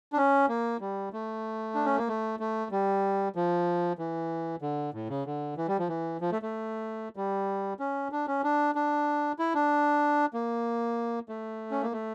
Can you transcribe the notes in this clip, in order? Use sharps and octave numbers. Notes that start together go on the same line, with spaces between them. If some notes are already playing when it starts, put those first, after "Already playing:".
D4
C#4
A#3
G3
A3
D4
C#4
A#3
A3
A3
G3
F3
E3
D3
A2
C#3
D3
E3
G3
F3
E3
F3
A3
A3
G3
C#4
D4
C#4
D4
D4
E4
D4
A#3
A3
C#4
A#3
A3